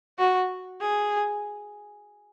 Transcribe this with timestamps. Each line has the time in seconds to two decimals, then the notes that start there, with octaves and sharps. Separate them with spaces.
0.19 F#4
0.81 G#4